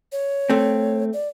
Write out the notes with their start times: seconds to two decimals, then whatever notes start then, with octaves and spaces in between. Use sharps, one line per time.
0.12 C#5
0.50 A3 C4
1.13 D5